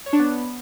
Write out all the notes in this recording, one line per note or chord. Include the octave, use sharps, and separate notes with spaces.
C#5
D4
B3